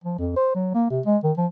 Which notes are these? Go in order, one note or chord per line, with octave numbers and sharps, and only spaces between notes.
F3
F2
C5
F#3
A#3
C3
G#3
D#3
F3